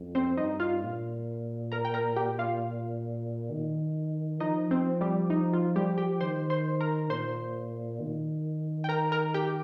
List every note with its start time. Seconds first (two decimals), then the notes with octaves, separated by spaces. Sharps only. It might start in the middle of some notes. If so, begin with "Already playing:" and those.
Already playing: F2
0.15 C4 C5
0.37 G2 D#4 D#5
0.60 F4 F5
0.83 A#2
1.72 A#4 A#5
1.85 G5
1.94 A#4 A#5
2.16 G4 G5
2.39 F4 F5
3.51 D#3
4.40 F3 D#4 D#5
4.71 C4 C5
5.01 G3 G4
5.30 D#4
5.53 F4
5.76 G3 G4
5.98 G4 G5
6.21 D#3 C5 C6
6.50 C5 C6
6.81 A#4 A#5
7.10 A#2 C5 C6
8.00 D#3
8.84 G5
8.89 A#4 A#5
9.12 A#4 A#5
9.34 G4 G5